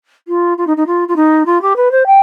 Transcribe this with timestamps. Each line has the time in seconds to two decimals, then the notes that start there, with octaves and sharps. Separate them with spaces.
0.28 F4
0.58 F4
0.67 D#4
0.77 D#4
0.87 F4
1.08 F4
1.16 D#4
1.46 F4
1.62 G4
1.76 B4
1.91 C5
2.06 G5